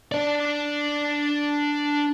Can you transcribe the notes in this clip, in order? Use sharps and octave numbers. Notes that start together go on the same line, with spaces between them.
D4 D5